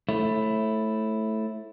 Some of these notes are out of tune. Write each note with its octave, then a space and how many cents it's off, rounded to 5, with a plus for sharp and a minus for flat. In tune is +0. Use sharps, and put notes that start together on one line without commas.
A3 +0 E4 +0 C#5 -35